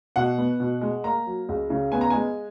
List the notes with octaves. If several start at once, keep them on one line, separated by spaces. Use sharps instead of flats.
B2 F#5
B3
B2
G#3
A#3 A#5
F#3
C#2
C#3
B3 G#5
A#5
G#3 G#5